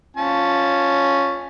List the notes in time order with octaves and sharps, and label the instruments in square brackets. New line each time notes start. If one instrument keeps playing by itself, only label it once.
[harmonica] C#4 F4 A5